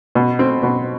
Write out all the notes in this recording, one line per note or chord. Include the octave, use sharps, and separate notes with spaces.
B2
C4
B2